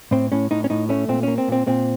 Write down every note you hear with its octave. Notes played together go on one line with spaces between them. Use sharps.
A2 C4
A2 C#4
A2 D#4
C#4
A2 D#4
A3 C#4
A#2 C4
A#3 C#4
C4
A#2 C4
A#2 C4